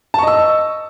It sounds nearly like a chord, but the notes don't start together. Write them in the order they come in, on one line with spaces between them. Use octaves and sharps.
A5 C#6 D#5 E6